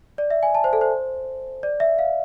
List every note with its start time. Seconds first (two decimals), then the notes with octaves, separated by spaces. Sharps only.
0.18 D5
0.30 E5
0.43 G#5
0.55 A5
0.64 C5
0.73 A4
0.81 C5
1.63 D5
1.80 E5
1.99 F5